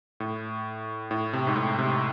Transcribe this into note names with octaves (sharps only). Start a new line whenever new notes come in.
A2
A2
C3
G#2
A2
C3